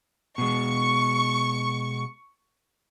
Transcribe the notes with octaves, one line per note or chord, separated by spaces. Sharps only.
B2 G#3 C#6